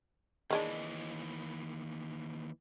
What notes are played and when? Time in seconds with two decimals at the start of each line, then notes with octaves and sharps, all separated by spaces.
0.50 D#2 D#3 E3 G#3 D4